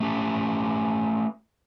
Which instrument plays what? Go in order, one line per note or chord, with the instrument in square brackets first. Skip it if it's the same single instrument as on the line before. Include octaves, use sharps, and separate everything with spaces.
[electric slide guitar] A3 C#4 G4 B4